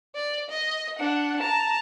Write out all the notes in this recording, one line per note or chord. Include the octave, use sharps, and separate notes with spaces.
D5
D#5
D4 F#5
A5 A#5